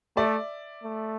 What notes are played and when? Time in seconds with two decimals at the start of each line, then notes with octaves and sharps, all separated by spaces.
0.17 A3 D5 E5
0.84 A3